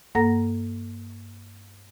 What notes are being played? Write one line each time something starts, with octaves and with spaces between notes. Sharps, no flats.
G2 A#3 A4 F#5 A#5 A#6